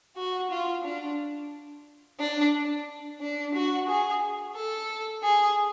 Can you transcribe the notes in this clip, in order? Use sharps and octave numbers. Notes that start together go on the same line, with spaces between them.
F#4
F4
D4
D4
D4
F#4
G#4
A4
G#4